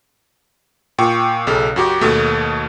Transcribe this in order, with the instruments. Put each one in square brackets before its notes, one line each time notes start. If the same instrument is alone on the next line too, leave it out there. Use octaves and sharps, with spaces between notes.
[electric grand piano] A#2 G5 C#6
B1 C#3 A4
F#2 F#4 G4
D#2 B2 A3